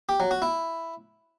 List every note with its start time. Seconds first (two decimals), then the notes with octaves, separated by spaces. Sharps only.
0.09 G4
0.20 F#3
0.31 F#4
0.42 E4